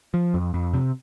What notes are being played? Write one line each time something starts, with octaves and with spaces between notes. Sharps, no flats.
F3
F2
F2
C3